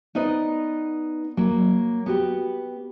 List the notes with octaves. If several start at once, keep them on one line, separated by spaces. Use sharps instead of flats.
B3 D#4 B4 D5 D#5
F#3 A#3
B3 F#4 G4